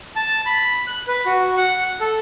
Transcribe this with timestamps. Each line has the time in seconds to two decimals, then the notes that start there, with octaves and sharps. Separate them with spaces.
0.16 A5
0.46 B5
0.87 F#6
1.07 B4
1.26 F#4
1.57 F#5
2.00 A4